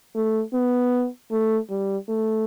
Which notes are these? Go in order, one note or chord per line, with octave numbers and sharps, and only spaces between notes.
A3
B3
A3
G3
A3